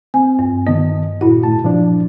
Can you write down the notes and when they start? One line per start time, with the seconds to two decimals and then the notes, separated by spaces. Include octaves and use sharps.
0.14 C4 G#5
0.39 G2
0.67 D#3 B3 D#5
1.21 A#2 E4 F#4
1.43 A2 A5
1.64 F3 D4